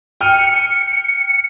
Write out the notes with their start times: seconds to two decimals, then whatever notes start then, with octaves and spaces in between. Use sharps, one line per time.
0.21 G5 F6 C#7 D#7